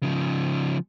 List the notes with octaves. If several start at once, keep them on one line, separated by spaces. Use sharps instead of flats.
C#3 F3